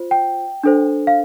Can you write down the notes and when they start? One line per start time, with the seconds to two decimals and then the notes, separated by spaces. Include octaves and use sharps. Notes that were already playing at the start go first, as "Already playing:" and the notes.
Already playing: F4 C5
0.11 G5
0.63 D4 A4 C5
1.07 F5